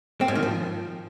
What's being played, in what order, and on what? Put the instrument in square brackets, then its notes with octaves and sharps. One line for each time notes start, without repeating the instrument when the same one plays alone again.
[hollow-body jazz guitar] C4
G#2
D#3
F3